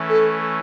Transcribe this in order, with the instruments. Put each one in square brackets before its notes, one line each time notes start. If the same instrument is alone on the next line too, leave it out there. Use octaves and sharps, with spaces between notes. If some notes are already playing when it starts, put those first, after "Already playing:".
Already playing: [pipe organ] E3 A3 C#4
[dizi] A4